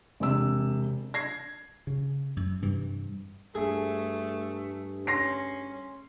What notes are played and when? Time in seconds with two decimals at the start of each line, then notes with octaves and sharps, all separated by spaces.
0.20 E1 C3 E6
1.14 G#6 A#6 C7
1.87 C#3
2.37 F#2
2.62 G2 C3 E3
3.55 G2 A3 G#4
5.07 C#4 C6 A#6 C7